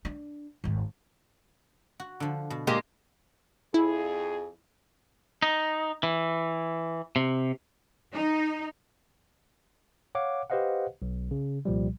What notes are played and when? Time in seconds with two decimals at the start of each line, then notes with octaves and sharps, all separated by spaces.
0.05 D4
0.64 G#1 D#2
2.00 F#4
2.20 D3 F3
2.50 B2
2.67 A#2 G#3 A#3 G4
3.74 F2 E4 G#4
5.42 D#4
6.03 E3
7.16 C3
8.12 D#4
10.15 C#5 F5 F#5 D6
10.50 G4 B4 C5 D#5 F5 F#5
11.02 B1
11.31 C#3
11.65 C2 A#2 F3 G3